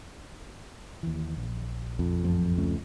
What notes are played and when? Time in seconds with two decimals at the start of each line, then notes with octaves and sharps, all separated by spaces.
1.03 D#2 E3
1.37 A#1
1.99 F2
2.23 A1 F#2 F3
2.58 C#2 A3 C#4